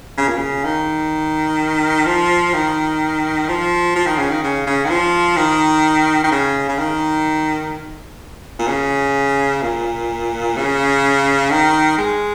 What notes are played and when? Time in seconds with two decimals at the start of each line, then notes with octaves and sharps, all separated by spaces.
0.17 C#3
0.28 A#2
0.37 C#3
0.65 D#3
2.06 F3
2.53 D#3
3.49 F3
3.96 F3
4.06 D#3
4.18 C#3
4.30 D#3
4.43 C#3
4.67 C#3
4.85 D#3
4.90 F3
5.37 D#3
6.24 D#3
6.31 C#3
6.68 C#3
6.79 D#3
8.59 A#2
8.68 C#3
9.62 A#2
10.57 C#3
11.51 D#3
11.98 G#3